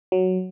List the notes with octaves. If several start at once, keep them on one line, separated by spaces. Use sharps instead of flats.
F#3